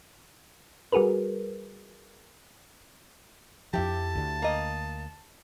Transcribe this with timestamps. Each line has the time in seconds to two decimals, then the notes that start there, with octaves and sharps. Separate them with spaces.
0.92 G3 F#4 G#4 A#4 B4
3.73 F2 F3 E4 G4 A5
4.16 D2 D3
4.42 A#3 D#5